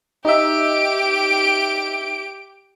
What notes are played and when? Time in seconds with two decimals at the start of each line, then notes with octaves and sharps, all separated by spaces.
0.25 D#4 G4 E5 D7